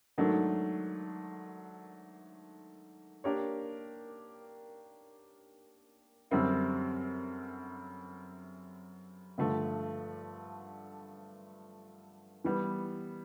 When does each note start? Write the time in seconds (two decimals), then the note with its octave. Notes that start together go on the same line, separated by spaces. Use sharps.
0.18 G#2 D#3 F#3 A3 D4
3.24 A#3 D4 G4 A#4 C#5
6.31 F#2 D3 G3 C4 E4
9.38 G2 D3 F3 A3
12.44 E3 G3 B3